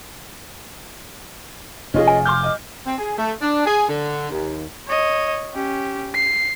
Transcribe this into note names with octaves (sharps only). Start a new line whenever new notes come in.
F1 C#4 F4 G#4 D#5
G#5
C6 D6 F6 G6
D#5
C4
G#4
A3
D4
G#4
D3
D#2
C#5 D#5
C#4 G4
C7